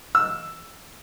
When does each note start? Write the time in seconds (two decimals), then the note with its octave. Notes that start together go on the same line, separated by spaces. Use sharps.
0.15 E6